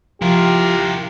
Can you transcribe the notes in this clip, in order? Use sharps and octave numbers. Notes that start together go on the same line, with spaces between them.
F3 E4 F4 G4 A#4